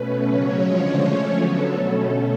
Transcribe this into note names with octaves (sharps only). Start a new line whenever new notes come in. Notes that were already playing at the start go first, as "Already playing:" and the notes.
Already playing: B2 A3 C#4 B4
C#3 F#3 C#4 C#5
D3 F3 G#3 C#5
F3 A3 C#4
D3 F#3 B3 A4
B2 A3 C#4